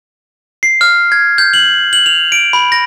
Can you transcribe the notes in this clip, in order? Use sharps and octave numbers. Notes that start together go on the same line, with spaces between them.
C7
F6
G#6
G6
F#7
F#7
F7
D7
B5
A#6